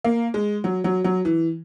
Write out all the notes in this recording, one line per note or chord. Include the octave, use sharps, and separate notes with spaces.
A#3
G#3
F#3
F#3
F#3
E3